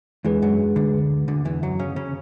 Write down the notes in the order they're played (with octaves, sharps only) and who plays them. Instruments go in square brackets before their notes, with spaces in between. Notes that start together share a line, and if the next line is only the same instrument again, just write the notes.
[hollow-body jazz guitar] E2 E3 [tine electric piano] G#3 D4 G#4 B4
[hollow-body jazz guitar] F#2 F#3
D2 D3
D2 D3
E2 E3
F#2 F#3
C#3 C#4
C#3 C#4